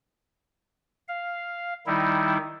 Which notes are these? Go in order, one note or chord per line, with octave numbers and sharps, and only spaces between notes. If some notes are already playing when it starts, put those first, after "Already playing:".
F5
D#3 G3 D#4 E4